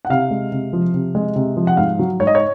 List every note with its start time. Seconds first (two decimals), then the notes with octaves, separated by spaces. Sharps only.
0.05 F#5
0.10 C3 F5
0.31 G#3
0.52 C3
0.73 F3
0.94 C3
1.15 G#3
1.36 C3
1.57 F3
1.67 F#5
1.77 G#2 F5
1.99 F#3
2.20 G#2 C#5
2.27 D#5
2.35 C#5